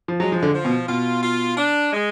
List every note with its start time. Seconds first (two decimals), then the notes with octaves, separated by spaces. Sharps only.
0.08 F3
0.19 F#3 G#3
0.32 F3
0.42 D3
0.54 F3
0.65 B2
0.88 B2 F4
1.23 F4
1.57 D4
1.92 G#3